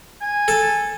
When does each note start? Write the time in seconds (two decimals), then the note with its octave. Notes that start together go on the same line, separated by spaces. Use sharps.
0.21 G#5
0.48 A4